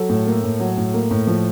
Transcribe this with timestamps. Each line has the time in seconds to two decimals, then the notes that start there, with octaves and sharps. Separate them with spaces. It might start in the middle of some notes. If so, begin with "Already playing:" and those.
Already playing: F#3 A4
0.09 A2
0.27 A#3
0.44 A2
0.60 F#3
0.77 A2
0.94 A#3
1.11 A2
1.27 F3